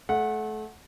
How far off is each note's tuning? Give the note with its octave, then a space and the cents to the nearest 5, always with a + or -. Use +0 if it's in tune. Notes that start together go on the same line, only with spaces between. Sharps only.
A3 -30 F#5 -10